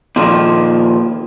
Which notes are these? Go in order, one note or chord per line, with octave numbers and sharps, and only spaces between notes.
A#2 D#3 F3